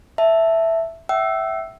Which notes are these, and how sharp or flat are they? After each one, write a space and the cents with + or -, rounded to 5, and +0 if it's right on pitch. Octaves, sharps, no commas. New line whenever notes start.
E5 +0 A5 +0
E5 +0 G5 -45 E6 +0